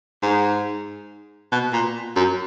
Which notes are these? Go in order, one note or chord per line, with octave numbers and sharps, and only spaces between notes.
G#2
B2
A#2
F#2